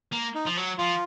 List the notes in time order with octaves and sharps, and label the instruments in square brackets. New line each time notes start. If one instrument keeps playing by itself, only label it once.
[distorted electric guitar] A#3
[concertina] D#4
[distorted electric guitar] F3
F#3
[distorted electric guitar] F3 [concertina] F4